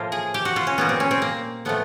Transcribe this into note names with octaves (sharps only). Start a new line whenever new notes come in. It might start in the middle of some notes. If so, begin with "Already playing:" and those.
Already playing: A2 F3 A#3 F4
G#4
G4
F#4
F4
C#4
A#2 G3 A#3 B3
C4
C#4
C4
A#3
A2 F3 A3 B3